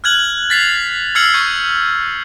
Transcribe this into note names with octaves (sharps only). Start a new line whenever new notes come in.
F6 F#6 G#6 F#7
A6 B6 C7 F7
E6 F6 G#6 C7 C#7 F#7
C#6 G6 G#6 C#7